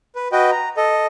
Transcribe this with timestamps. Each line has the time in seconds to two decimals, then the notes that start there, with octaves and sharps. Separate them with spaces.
0.15 B4
0.32 F#4 B4 D#5 G5
0.51 A#5
0.77 A4 D#5